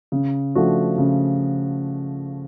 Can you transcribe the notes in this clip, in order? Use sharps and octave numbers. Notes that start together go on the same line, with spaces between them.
C#3
F3 A3 D4 F#4
C#3